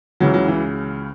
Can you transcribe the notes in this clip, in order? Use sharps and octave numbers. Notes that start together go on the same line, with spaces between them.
C#2 C#3 E3 F#3
F#3
E3